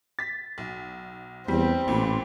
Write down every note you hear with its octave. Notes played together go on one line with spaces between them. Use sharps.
A6 B6
B1
E2 G3 C4
A1 A#2 B5